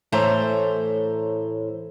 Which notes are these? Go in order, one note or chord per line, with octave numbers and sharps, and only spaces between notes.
A2 E3 A3 C5 C#5 A#5